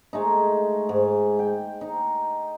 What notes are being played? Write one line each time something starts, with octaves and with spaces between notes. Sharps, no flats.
G#3 A3 D#4
G#2
G5
D#4